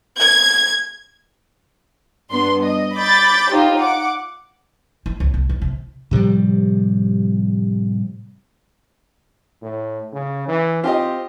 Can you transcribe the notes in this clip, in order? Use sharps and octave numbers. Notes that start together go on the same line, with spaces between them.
G#6
G2 B3 D4 C6
D#5
B5 D6 G6 A6
D#4 F4 G4 C5
F#5 D6
E4
C#2
C2
D#2
C3
A2 C3 F3 G3
A2
C#3
E3
C4 F4 G4 D#5